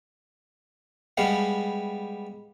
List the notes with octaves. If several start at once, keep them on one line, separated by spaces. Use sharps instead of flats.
G3 G#3 B3 F5